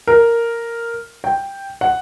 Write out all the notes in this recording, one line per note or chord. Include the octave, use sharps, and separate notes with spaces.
A#4
G5
F#5